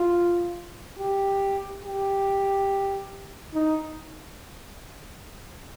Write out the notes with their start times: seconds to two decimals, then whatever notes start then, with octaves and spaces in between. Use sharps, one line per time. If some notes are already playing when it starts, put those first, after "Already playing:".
Already playing: F4
0.99 G4
1.84 G4
3.54 D#4